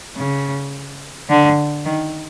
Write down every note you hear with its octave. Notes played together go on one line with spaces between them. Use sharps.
C#3
D3
D#3